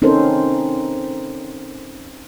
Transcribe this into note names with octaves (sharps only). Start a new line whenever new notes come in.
C4 C#4 D#4 A4 A#4 C5